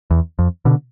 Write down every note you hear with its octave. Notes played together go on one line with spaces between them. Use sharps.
E2
F2
B2 D3